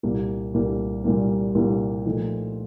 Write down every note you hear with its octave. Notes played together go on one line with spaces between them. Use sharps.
C2 A#2 G3 A#3
C2 A#2 G3 A#3
C2 A#2 G3 A#3
C2 A#2 G3 A#3
A#2 F3 A3 D#4